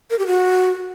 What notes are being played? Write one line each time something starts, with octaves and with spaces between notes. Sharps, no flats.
A#4
G4
F#4